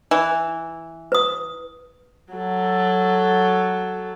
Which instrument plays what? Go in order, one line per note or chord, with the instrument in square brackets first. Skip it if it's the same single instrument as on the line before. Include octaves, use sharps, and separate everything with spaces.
[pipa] E3
[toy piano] B4 D#6
[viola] F#3 A4